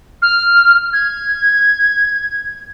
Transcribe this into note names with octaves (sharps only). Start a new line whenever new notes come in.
F6
G#6